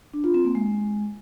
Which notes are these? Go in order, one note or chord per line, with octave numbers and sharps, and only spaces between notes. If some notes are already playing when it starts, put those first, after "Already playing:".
D4
F4
C4
A#3
G#3